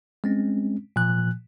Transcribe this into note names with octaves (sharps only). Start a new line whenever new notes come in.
G#3 C4 C#4
A#2 F3 F#6